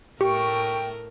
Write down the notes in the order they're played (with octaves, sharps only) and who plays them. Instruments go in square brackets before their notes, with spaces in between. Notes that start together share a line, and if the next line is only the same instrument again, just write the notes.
[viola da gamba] A2 A3 A#4 [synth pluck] G4 [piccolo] G5 [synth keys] C#6